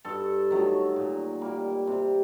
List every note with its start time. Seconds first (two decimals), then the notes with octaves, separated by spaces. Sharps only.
0.05 G2 A4
0.51 D#3 F#3 A3
0.96 A#2
1.42 G3 A#3
1.87 C3